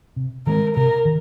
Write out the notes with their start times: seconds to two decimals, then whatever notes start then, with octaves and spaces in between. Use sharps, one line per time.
0.16 C3
0.47 D#3 G#3 C4 A#4
0.76 C3 A#4
1.05 D#3